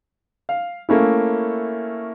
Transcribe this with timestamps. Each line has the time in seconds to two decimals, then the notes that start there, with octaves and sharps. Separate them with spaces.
0.49 F5
0.89 A3 A#3 C#4 E4